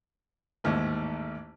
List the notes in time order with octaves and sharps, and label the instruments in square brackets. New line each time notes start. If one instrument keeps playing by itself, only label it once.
[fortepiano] A1 D#2 G#2